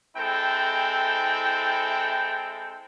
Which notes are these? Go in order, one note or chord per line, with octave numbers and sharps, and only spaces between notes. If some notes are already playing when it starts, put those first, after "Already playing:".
G#3 C4 E4 A4 G5